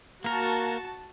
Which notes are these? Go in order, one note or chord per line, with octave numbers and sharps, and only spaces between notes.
A#3 F#4 A#4 A5